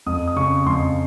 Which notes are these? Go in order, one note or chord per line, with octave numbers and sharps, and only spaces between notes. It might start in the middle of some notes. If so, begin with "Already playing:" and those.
F2 D#6
D#6
C#3 C#6
F2 C6